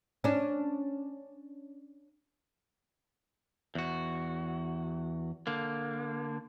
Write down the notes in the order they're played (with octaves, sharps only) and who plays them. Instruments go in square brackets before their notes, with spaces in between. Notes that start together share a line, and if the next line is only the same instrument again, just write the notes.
[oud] C#4 D4
[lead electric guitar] E2 F#4
D3 A#3